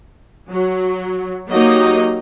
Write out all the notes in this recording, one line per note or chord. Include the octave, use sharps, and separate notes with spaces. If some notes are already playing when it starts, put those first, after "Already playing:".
F#3
F#3 A#3 D#4 F#4 G4 D#5